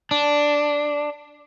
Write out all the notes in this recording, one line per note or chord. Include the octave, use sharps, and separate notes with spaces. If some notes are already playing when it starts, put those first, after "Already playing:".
D4